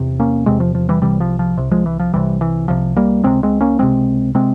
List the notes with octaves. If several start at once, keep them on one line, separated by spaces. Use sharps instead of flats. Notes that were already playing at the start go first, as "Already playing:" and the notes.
Already playing: E2 C3
A#3 C#4
E2 C3 G#3 C4
F3
F3
E3 G3
C2 C3 E3 G3
F3
F3
C2 C3
F3 G#3
E3
F3
C2 C3 E3 G3
E3
C2 C3 F3
G3 A#3
C#2 C3 G#3 C4
G#3 C4
A#3 C#4
C#2 C3 G#3 C4
C3 G#3 C4